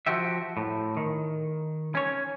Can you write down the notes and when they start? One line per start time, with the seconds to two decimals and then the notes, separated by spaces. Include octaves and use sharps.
0.06 F3 F#4 G4 E5
0.57 A2
0.97 D#3
1.95 C#4 C#5